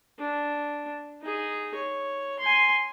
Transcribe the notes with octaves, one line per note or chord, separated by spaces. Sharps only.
D4
D#4 G#4
C#5
G#5 C6